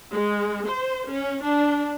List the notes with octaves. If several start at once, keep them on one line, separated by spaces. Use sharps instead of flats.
G#3
C5
C#4
D4